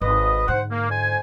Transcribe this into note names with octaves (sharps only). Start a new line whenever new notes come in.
G#1 B4 D#5
G#2 D3 C5 F#5
A#3
F2 C5 G#5